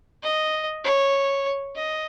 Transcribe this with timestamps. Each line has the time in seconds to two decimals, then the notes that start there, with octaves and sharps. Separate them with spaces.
0.23 D#5
0.84 C#5
1.76 D#5